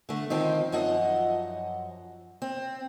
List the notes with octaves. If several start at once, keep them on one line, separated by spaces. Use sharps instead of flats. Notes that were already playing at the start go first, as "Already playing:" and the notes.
D3 A3
D#3 F3 C4 D#4
F#2 F3 D#5 F#5
C4